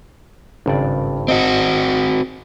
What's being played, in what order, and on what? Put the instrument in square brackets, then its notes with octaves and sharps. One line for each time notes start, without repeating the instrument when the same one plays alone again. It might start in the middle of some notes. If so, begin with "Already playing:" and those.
[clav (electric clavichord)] G#1 G2 D5 [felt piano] C#3
[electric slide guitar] C4 F#4 [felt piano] D#5